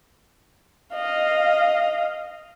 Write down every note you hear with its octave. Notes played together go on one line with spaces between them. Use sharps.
D#5 F5